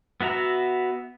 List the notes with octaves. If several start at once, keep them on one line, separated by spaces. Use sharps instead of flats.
B3 F#4 E5 A#5